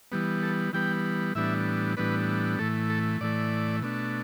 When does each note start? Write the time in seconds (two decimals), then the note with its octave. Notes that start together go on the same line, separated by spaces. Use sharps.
0.12 E3 G3 B3
0.43 A4
0.73 E3 G3 B3 G5
1.35 A2 E3 G3 B3 D4 E5
1.97 A2 E3 G3 B3 D4 B4
2.59 A2 E3 A3 A4
2.90 A4
3.21 A2 E3 A3 D5
3.83 B2 A3 D4